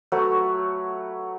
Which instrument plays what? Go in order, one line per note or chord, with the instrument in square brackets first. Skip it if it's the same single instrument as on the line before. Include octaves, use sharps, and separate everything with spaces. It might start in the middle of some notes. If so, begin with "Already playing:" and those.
[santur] F#3 A3 B4 C#5